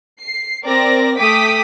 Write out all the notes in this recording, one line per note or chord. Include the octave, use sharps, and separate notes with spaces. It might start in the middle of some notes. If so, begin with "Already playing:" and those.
C7
C4 A#4 D5 A#6
A3 G5 D6 D#6 B6